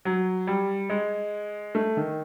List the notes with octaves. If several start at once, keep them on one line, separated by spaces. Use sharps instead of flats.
F#3
G3
G#3
A3
D#3